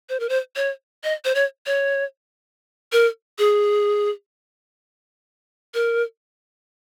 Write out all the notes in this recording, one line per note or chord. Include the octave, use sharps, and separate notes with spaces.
C5
A#4
C5
C#5
D#5
C5
C#5
C#5
A#4
G#4
A#4